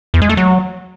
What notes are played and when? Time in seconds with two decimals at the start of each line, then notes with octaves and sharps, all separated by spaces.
0.14 E2
0.22 G#3
0.29 A3
0.37 F#3